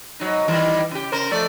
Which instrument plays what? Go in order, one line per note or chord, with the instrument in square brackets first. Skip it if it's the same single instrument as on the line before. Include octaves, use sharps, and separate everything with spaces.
[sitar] G#2 F#3 D#4
D#3 E3 G3
C#3 G4
C#3 A#4 C5
F3 A3 D5